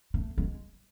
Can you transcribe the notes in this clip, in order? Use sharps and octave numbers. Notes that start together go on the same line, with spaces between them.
A3
G#3